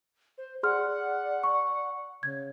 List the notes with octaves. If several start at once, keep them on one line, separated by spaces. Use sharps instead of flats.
C5
G#4 D5 F#5 C6 F6
C#6
C#3 G#6